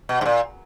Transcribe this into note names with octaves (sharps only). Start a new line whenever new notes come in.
B2
G#2
A#2